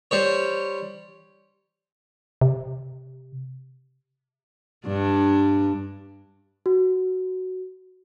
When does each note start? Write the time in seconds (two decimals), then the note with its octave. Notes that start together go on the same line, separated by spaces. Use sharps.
0.11 G3 C5 C#5
2.41 C3
4.87 G2 D4
6.66 F#4